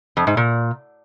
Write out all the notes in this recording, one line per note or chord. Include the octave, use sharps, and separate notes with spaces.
F2
G#2
A#2